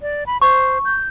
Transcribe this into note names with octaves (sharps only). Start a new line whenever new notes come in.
D5
B5
C5 C#6
G6